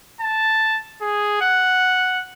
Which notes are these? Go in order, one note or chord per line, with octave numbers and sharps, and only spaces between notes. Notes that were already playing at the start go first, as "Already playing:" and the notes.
A5
G#4
F#5